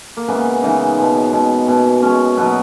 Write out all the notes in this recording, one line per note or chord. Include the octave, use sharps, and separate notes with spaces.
A#3
C#3 E3 G#3 B3
C#3 E3 G#3 D#4
B2 G#3
B2 G#3
B2 G#3
B2 G#3 C#4
B2 F#3 B3